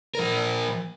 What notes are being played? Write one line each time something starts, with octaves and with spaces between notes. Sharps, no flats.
F3 A#4